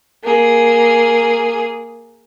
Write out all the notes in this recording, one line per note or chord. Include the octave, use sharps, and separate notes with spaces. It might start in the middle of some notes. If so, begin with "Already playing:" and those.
A#3 G#4